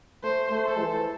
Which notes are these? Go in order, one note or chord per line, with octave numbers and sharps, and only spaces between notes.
A3 C5
A3
A4
E3